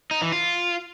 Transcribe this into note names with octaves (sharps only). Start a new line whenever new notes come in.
D#4
E3
F4